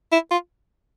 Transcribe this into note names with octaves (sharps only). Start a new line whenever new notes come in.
E4
F4